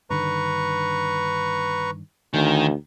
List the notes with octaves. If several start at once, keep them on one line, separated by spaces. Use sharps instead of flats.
G2 D3 D#3 B4 A#5 C#6
D2 D#3 G#5